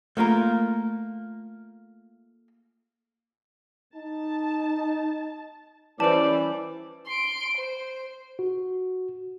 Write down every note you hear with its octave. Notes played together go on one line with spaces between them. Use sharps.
A3 A#3 F4 A#4
D#4 A5
E3 G3 C#4 C5 D5 A5
C6 D7
C5
F#4